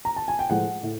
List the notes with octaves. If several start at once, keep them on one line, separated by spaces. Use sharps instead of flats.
A#5
A5
G#5
G5
A2 F3 G#3 F#5
A2